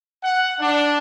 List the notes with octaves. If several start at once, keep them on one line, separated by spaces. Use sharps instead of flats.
F#5
D4